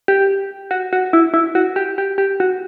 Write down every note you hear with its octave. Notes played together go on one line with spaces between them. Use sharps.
G4
F#4
F#4
E4
E4
F#4
G4
G4
G4
F#4